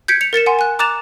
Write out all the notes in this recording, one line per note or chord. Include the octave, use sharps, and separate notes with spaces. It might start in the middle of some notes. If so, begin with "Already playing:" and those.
G6 G#6 B6 C#7 D7
C#7 F7
A#4 A6 C#7 E7
F#5 G#5 C6
G#5 F#6
A#5 D6 F#6 A6 E7 F7